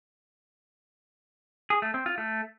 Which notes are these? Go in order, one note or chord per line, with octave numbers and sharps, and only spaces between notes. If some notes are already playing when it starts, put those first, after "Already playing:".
G#4
A3
C4
F4
A3